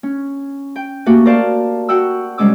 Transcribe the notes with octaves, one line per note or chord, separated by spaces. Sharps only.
C#4
G5
A3 A#3 F#4 G4
A#4 C5 D5 F5 A5
F#4 F#5 G5 E6
C3 G3 G#3 C#4 D6 E6